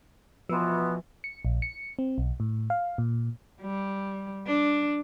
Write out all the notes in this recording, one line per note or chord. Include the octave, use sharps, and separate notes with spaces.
B2 E3 F3 B3 C6 E6
C#7
A#1
C#7
C4
B1
A2
F5
A#2
G3
D4